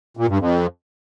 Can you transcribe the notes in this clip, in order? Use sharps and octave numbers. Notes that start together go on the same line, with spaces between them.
A#2
G2
F2